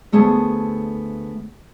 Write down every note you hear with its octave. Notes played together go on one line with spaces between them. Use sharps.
D2 A3 B3 G#4 C5 A5